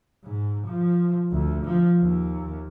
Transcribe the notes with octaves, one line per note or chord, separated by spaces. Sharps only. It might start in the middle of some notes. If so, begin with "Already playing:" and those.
G#2
F3
D2
F3
D#2